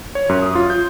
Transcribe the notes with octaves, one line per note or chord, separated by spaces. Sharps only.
C#5
F#2
D#6
F4
G6